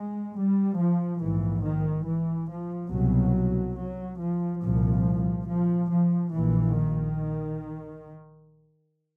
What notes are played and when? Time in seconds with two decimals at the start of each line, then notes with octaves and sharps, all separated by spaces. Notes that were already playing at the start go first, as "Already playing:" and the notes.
Already playing: G#3
0.36 G3
0.78 F3
1.20 A#1 G#2 E3
1.63 D#3
2.06 E3
2.49 F3
2.91 C2 B2 F#3
3.77 F#3
4.18 F3
4.61 C2 A#2 F3
5.47 F3
5.89 F3
6.32 A#1 A#2 E3
6.75 D#3